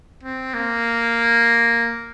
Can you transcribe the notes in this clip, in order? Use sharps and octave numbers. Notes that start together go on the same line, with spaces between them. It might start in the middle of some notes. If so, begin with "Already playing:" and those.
C4
A#3